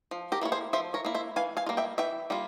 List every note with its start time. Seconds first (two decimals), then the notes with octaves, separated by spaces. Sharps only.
0.11 F3
0.32 G4 A#4
0.41 A#3 E4 C#5
0.52 G#4 C5
0.73 F3 C5 E5
0.94 A#4 C#5
1.05 A#3 E4
1.14 C5 E5
1.36 E3 F5 G#5
1.57 F5 G#5
1.66 G3 A#3 F4
1.77 E5 G5
1.98 E3 E5 G5
2.30 G3 A#3 F4